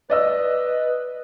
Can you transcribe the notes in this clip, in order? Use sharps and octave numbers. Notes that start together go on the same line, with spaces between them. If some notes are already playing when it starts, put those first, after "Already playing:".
B4 D5 D#5 E6